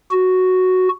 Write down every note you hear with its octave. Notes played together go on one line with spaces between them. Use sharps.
F#4